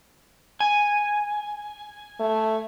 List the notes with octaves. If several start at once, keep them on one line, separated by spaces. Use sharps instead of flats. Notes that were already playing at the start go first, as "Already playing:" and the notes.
G#5
A3